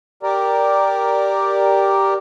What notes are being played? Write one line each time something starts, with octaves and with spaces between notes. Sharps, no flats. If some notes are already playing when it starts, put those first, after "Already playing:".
G4 A#4 D5